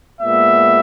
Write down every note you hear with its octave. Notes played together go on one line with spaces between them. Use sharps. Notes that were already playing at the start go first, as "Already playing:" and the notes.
A#2 G#3 B3 E5